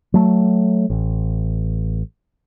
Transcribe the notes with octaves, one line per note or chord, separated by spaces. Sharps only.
F#3 A3
A1